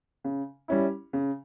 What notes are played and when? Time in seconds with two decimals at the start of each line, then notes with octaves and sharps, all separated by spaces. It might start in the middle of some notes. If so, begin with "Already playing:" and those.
0.24 C#3
0.68 G3 C#4 E4
1.13 C#3